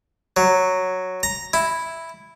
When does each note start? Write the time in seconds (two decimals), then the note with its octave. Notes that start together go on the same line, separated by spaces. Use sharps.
0.37 F#3
1.23 A#5
1.54 E4